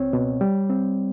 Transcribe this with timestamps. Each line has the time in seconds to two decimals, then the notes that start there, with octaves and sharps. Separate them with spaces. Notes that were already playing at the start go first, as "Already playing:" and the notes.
Already playing: C#2 C4 C#5
0.13 B2
0.41 G3
0.70 C4